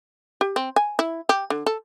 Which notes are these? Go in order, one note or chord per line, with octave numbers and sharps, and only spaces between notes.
G4
C4
G#5
E4
G4
D3
A4